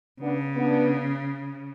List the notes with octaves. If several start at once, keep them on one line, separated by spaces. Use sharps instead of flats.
C#3 B3 D4
B3 D4